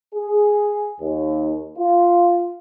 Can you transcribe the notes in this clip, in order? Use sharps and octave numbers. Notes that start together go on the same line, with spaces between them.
G#4
D#2
F4